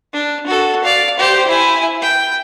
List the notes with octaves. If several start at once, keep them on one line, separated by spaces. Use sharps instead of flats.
D4
F#4 A4
D5 F5
G4 C5
E4 G#5
G5